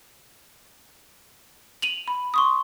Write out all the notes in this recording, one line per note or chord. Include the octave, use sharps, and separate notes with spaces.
D#7 F7 F#7
B5
C6 C#6 D#6